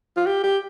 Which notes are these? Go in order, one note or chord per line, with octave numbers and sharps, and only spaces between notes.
F4
G4
G4